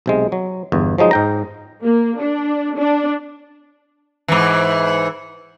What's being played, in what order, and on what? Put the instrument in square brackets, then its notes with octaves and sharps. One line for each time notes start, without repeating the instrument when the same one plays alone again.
[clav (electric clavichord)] B1 C3 G#3
F#3
G1 E2 G2
F3 F#3 G#3 D#4
G#2 G5 A#5
[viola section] A#3
D4
D4
[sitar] G#2 E3